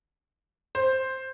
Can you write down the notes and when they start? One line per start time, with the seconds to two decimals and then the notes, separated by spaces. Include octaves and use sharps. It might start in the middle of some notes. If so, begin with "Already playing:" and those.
0.75 C5